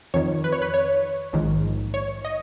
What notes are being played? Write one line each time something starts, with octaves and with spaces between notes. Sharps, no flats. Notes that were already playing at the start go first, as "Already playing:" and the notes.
F2 D#3 C#5
B4
C#5
B4
C#5
A#1 G#2 D#3
C#5
D#5